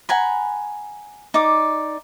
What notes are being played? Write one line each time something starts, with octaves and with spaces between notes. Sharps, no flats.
F#5 G#5 A#5 B5
D#4 D5 D6